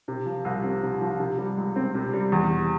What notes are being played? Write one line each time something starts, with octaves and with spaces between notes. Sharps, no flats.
C3
F3
C2
C4
C3
F3
C3
G3
C#2
C4
C3
G3
E2
C3